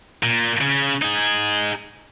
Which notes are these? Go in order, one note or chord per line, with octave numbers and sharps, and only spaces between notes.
A#2
C#3
D#4 G#4